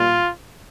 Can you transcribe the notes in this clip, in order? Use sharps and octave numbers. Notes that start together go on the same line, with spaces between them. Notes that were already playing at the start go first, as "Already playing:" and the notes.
Already playing: A#2 G3 F4